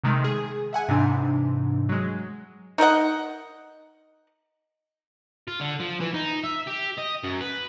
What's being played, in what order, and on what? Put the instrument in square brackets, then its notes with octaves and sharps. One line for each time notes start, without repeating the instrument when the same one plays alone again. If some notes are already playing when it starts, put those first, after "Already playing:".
[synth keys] C3 D#3 G#3 A3
G#4
E5 F#5 G#5
G#2 C3 E3 D4
F#3 G#3
[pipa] D#4 A#4 D#5 F#5
[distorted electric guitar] F4
D3
F3
E3
D#4
E5
G4
D#5
F#2
B4